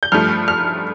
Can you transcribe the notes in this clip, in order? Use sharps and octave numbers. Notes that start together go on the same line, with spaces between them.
G6
G2 F3 A3 F6
F6